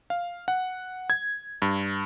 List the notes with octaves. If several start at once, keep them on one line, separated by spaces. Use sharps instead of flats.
F5
F#5
G#6
G2